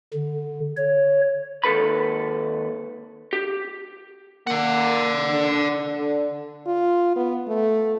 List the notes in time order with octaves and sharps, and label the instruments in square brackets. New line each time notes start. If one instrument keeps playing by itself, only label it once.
[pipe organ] D3
C#5
[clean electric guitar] D#2 B2 A4 B4 B5
G4
[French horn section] A#3 [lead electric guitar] D5 F#5
[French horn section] D3
D3
[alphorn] F4
B3
A3